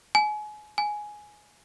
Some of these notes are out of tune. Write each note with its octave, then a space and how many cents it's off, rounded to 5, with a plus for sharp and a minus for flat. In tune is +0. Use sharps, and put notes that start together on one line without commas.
G#5 +30
G#5 +10